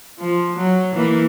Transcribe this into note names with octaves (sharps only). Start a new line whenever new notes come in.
F3
F#3
E3 A#3 E4